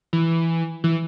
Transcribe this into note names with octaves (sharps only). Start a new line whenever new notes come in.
E3
E3